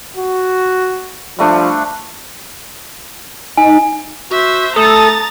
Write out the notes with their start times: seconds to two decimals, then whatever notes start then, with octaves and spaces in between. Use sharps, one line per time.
0.17 F#4
1.39 F3 G3 A3 D4
3.57 D#4 G#5
4.31 F#4 C5 E5
4.76 A3 A4 A#5 D#6 A6